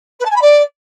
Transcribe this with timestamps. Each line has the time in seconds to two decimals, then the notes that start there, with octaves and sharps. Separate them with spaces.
0.19 B4
0.25 A5
0.30 G#5
0.36 B5
0.41 D5